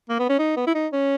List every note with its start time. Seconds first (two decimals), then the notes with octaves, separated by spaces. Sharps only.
0.09 A#3
0.19 B3
0.29 C#4
0.39 D#4
0.57 B3
0.67 E4
0.75 D#4
0.93 C#4